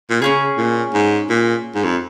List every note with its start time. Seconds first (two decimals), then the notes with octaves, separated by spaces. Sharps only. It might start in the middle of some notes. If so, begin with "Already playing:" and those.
0.10 A#2
0.22 C#3 C#4 F4 G#4
0.58 A#2
0.94 G#2
1.30 A#2
1.75 G#2
1.84 F2